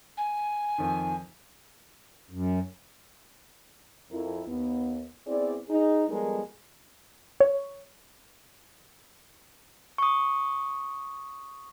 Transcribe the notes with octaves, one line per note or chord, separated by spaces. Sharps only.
G#5
F2 D#3
F#2
F2 E4 A#4
D#2 B3
B3 C4 E4 G#4 D5
D#4 G#4
F3 G3 G#3 B3 A4 A#4
C#5
C#6 D#6